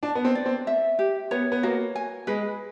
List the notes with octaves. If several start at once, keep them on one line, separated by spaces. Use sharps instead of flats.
D4 A5
B3
C4
D5
C4
E5
G4
B3 C#5
B3
A#3 F#4
G#5
G#3 B4